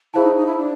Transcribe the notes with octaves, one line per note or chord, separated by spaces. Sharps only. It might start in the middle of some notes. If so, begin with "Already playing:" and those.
E4 G#4 C5 F5 A5
D#4
D#4
E4
D4